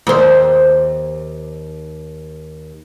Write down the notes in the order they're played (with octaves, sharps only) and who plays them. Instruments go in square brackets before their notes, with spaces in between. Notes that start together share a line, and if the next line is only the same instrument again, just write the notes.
[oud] D#2 C5